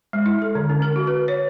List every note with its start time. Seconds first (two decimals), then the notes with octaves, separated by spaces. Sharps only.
0.13 G#3
0.26 E4
0.42 A4
0.55 D3
0.70 C#4
0.82 A#4
0.96 F#4
1.07 B4
1.28 C#5